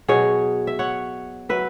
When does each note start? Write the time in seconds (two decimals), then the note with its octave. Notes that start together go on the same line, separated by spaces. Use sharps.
0.08 B2 F#3 G#4 C#5
0.67 E5
0.79 C#5 F#5
1.49 F#3 B4 E5